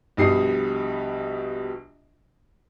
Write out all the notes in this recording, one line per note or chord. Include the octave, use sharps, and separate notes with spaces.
A#1 B2 G3 D#6 C7